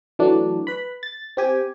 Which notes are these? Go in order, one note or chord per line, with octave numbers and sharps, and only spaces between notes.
E3 F#3 A3 D4
B4 B5
A6
C4 G4 G#5